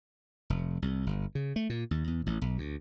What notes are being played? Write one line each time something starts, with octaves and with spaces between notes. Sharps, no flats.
F1
C2
G1
C#3
A3
A#2
D#2
E2
A1
B1
D2